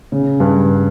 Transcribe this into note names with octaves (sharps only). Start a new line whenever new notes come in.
C#3
G2